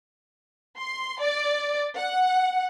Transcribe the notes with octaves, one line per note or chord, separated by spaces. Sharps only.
C6
D5
F#5